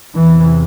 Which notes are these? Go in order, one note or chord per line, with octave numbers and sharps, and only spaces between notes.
E2 C3 E3